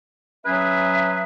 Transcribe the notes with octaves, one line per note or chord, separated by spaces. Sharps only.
F#3 C#4 G#4 B4 E5